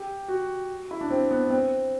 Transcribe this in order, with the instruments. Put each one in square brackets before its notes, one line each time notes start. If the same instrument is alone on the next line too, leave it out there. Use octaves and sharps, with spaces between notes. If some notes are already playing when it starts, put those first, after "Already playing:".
Already playing: [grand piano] G4
F#4
E4
D4
C4
B3
C4